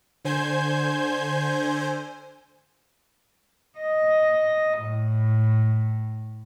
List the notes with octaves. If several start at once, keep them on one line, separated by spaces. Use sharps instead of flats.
D3 C5 G#5 G6
D#5
A2